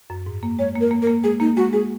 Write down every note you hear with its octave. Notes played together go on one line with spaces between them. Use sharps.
F#2
G#2
A#3
G#3 C#5
A#3
A#4
A#3
A#4
A#3
G#3 G#4
A#3 D#4
G#3 F#4
G#3 G#4